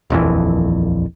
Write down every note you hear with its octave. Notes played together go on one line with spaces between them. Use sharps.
D#1 A#1 F2 E3